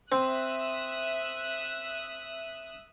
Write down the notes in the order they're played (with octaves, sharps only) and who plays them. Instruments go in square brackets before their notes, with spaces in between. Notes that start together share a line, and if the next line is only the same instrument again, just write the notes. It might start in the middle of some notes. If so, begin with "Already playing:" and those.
[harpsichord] C4 [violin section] E5 D#6 F#6